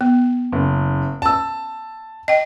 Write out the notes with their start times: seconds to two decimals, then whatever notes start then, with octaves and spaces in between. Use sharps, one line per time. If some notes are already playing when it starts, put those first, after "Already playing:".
0.01 B3
0.52 F#1
1.22 A5 E6
2.28 D#5 G5